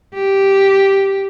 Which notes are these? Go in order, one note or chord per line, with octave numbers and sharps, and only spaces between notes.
G4